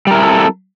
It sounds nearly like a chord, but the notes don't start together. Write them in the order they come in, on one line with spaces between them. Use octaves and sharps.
G3 A#4 E4 C4 A4